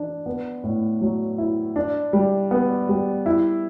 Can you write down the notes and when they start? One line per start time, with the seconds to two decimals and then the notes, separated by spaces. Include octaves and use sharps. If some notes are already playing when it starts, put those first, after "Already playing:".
Already playing: E3 D4
0.26 B3
0.64 A2
1.01 F#3
1.38 E4
1.76 D4
2.13 G3
2.51 B3
2.89 G3
3.26 E4